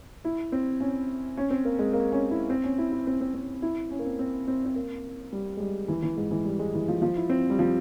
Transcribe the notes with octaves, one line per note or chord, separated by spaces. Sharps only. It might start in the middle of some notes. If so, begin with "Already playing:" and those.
E4
C4
C#4
C#4
C4
A#3
G#3
A#3
C#4
E4
C4
C#4
E4
E4
C4
C4
C4
E4
C#4
A#3
C4
C4
C4
C4
A#3
G3
G#3
G3
E3
E3
G#2
E3
G3
G#3
E3
F3
F3
E4
C4
G3
F3